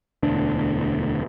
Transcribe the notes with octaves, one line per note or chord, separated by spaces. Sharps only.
E1 D2 D4